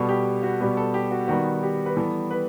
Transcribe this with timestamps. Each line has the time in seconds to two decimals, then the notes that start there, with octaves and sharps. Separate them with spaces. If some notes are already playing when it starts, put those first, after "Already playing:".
Already playing: B2 G3 B3 A4
0.09 G4
0.43 F#4
0.60 B2 G3 B3 G4
0.77 A4
0.94 G4
1.11 F#4
1.28 D#3 G3 B3 F#4
1.63 G4
1.86 B4
1.96 E3 G3 B3 A4
2.31 B4